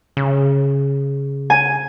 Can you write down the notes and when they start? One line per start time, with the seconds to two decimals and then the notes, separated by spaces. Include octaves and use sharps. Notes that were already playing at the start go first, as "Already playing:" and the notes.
0.17 C#3
1.50 G#5